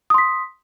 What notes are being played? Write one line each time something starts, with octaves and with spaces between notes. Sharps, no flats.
C6 D#6 B6